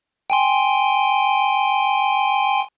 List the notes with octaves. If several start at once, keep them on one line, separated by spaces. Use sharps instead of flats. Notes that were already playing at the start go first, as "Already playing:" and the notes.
G5 G#5 C6